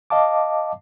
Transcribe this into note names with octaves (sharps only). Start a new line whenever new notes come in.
D#5 F5 A5 D6